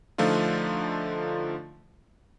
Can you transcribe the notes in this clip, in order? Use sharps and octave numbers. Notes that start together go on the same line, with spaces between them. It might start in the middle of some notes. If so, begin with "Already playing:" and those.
D3 F3 A3 D#4 F4